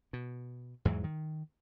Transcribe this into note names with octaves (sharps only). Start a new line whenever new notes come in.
B2
E2 G#2 E3 F#3
D#3